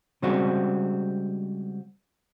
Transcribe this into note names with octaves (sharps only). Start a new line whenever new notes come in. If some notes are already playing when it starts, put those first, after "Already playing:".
C#3 G3 G#3 C4 F#4